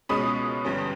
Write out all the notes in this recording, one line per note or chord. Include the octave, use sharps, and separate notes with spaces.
C#2 B2 G#3 C#4 B5 D#6
G1 G2 G3 C#4